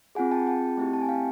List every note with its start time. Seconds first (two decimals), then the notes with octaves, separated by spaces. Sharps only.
0.15 C4 F4 G#4 F#5 G#5
0.31 G5 A5
0.47 G5 A5
0.77 A3 C4 E4 G4
0.93 A5
1.02 G#5
1.09 F5 G5